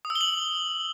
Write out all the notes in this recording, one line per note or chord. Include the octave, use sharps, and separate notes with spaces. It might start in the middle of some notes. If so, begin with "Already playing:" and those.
D#6
E6
G7
F#7